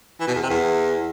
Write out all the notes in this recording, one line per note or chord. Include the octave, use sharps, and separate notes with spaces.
E3
B2
E2
C3
E2